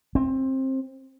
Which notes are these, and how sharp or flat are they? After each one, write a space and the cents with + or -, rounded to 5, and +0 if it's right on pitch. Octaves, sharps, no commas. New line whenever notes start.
C4 +20